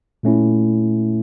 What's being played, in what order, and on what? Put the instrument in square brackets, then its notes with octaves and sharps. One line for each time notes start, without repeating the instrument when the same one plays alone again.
[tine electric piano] A#2 A3 C#4 E4